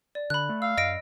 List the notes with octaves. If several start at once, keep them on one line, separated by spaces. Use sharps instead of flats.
D5
D3 B5 F#6
A3
F5 E6
F#2 D#5 A#6 D7